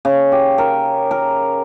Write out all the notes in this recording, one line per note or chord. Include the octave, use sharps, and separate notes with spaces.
C#3
G4
A#4
A#4